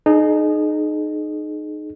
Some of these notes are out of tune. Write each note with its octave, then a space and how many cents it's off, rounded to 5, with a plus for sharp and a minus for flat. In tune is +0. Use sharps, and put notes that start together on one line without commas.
D#4 -25 G#4 +30